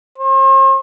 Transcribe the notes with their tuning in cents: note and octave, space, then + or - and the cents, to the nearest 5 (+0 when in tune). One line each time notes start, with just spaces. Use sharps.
C5 +45